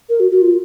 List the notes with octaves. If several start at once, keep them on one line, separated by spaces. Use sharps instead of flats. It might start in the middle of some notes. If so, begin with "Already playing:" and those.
A#4
F#4
F#4
F4